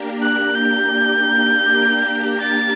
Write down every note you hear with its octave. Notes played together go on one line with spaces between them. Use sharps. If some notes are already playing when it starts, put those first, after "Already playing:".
Already playing: A#3 D4 G4 A#4
F#6
G6
A6